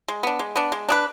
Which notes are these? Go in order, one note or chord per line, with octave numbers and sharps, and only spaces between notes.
G#3
B3 D4
G#3
B3 D4
G#3
D4 G#4 B4